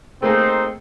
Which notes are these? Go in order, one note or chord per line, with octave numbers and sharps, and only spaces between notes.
A3 A#3 C4 D#4 G#4 C6